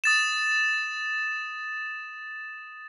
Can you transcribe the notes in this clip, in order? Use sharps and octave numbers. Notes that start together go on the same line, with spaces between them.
D#6 A6 E7